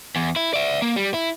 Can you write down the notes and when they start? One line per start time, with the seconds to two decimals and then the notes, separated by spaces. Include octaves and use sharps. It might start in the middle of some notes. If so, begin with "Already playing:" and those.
0.16 E2
0.36 E4
0.53 D5 E5
0.82 A#3
0.96 G3
1.14 E4